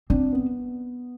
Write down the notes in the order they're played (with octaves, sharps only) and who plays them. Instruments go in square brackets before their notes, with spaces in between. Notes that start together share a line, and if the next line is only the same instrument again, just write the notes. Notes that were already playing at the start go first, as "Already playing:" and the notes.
[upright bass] C4 [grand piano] D4
[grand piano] B3